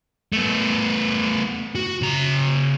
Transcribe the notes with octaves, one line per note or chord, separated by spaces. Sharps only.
A3 B3
F#4
C#3 A#5